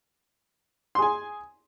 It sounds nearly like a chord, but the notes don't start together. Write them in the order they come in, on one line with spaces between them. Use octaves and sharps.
C6 G#4 G#5